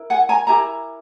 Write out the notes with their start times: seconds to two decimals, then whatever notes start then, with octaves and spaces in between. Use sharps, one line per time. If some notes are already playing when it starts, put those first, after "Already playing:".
Already playing: E4 A#4
0.10 F#5 G#5
0.29 G#5 A#5
0.47 E4 G4 A#4 G#5 A#5